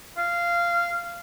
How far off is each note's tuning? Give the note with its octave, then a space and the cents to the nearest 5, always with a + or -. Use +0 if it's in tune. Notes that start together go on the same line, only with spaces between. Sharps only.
F5 -15